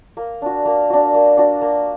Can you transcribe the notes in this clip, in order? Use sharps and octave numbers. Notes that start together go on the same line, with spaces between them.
A#3
D4 F#4
A#3
D4 F#4
A#3
D4 F#4
A#3